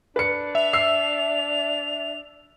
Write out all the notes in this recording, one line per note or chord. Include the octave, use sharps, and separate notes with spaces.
D4 B4 C#7
E5 F7
E6 C7